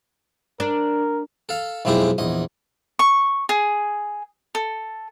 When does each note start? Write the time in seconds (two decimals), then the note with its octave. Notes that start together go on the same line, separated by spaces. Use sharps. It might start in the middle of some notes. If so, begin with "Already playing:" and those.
0.60 D4 A#4
1.49 A4 F5
1.85 B1 F2 G#3 E4 G4 G#4
2.18 A#1 E2 D#5
2.99 C#6
3.49 G#4
4.55 A4